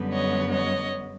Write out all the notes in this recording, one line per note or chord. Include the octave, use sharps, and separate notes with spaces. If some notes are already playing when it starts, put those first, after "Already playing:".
Already playing: F#2 D3 G3 B3
C#5 D#5
C#5 D#5